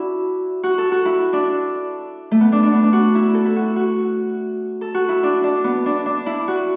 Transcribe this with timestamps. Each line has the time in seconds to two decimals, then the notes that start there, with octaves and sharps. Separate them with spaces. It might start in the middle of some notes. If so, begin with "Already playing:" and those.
Already playing: D4 E4 F#4
0.63 F#4
0.78 A4
0.92 F#4
1.05 E4
1.33 D4
2.31 A3
2.41 B3
2.52 D4
2.63 D4
2.72 B3
2.84 D4
2.93 F#4
3.15 E4
3.34 A4
3.45 E4
3.56 F#4
3.76 F#4
4.81 A4
4.94 F#4
5.09 E4
5.23 D4
5.44 D4
5.64 B3
5.86 D4
6.06 D4
6.26 E4
6.48 F#4